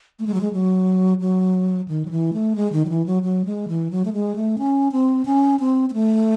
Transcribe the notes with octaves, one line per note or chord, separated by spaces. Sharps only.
A3
G#3
F#3
G#3
F#3
F#3
D#3
F#3
E3
A3
G#3
D#3
F#3
E3
F#3
F#3
G#3
E3
F#3
A3
G#3
A3
C#4
C4
C#4
C4
C4
A3